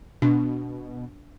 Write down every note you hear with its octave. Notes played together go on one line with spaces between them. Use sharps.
B2 D4